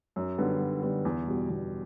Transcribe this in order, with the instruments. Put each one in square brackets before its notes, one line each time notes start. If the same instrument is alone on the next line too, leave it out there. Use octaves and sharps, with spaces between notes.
[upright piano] F#2
D3 G3 B3
F#2
D3 G3 B3
E2
B2 G3
E2